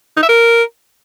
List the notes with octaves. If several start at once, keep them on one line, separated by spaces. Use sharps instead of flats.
D#4
E5
A#4